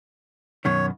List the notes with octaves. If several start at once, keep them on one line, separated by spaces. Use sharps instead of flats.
F#2 B2 D#3 C#5